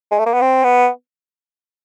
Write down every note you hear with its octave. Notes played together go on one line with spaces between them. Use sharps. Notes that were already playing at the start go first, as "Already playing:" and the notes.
G#3
A3
A#3
B3
C4
B3